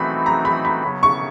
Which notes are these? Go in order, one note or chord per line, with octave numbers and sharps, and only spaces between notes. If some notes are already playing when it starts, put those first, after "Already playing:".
Already playing: E3 A3 C4 D#4 F#4 B5
A#5
B5
B5
C#3 F#3 B3
C#6